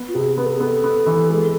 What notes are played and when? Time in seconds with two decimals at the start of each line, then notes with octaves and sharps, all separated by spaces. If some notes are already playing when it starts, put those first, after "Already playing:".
Already playing: B3
0.08 F4
0.14 C3 G#4
0.37 B3 B4
0.45 A4
0.53 G#4
0.60 B3 A4
0.84 B3
1.06 E3
1.30 G#3